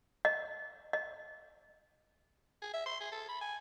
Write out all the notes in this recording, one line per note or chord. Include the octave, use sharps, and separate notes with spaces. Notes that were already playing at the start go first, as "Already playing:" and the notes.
D#5
D#5
G#4
E5
C6
G#4
A4
B5
G#5